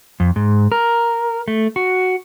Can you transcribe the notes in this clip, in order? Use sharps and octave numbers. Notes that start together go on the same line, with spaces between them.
F2
G#2
A#4
A3
F#4